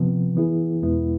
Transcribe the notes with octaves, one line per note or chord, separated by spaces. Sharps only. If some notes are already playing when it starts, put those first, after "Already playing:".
Already playing: C3 F3 B3
E3 B3 E4 G#4
E2 B2 G#3 B3 E4